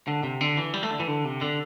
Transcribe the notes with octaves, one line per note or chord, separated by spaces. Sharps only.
D3
C3
D3
E3
G3
A3
D3
E3
D3
C3
D3